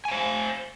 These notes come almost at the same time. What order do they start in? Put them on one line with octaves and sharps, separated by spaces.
G#5 F5 C5